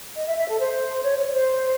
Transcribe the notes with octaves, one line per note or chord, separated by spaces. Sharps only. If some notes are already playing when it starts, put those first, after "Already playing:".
D#5
E5
E5
A4
C5
C#5
C#5
C#5
C5